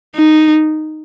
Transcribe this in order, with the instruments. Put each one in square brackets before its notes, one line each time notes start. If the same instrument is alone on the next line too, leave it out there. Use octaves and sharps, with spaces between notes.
[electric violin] D#4